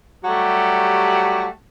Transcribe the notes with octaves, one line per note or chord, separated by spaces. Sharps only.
F#3 G3 A3 F#4 G4